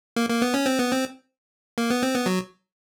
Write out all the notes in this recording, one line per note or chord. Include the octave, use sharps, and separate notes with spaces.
A#3
A#3
B3
C#4
C4
B3
C4
A#3
B3
C4
B3
F#3